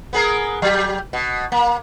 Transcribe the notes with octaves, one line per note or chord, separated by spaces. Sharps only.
B3 G#4 A#4
F#3 G4
B2
A#3